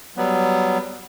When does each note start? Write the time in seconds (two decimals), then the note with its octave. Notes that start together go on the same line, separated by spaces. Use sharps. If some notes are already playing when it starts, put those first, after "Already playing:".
0.17 F#3 G3 B3